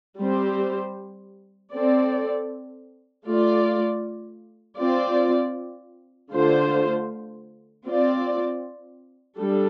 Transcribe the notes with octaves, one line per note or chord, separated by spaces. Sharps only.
G3 C4 G4 C5
C4 A4 D5
A3 F4 D5
C4 F4 D5
D3 A3 F4 C5
C4 F4 D5
G3 D4 A4